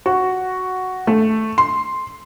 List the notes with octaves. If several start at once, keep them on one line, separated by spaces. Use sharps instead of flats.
F#4
A3
C6